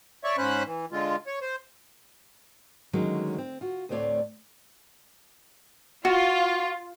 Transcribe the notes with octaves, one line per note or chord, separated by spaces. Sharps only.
C#5 D5 E5 C#6
G#2 C#4 C5 B5 F#6
E3
D3 G#3 F4
C#5
C5
D3 D#3 F#3 G#3 A3 C#4
C4
F4 F#4
D2 A2 A3 C4 C#5 D5
F4 F#4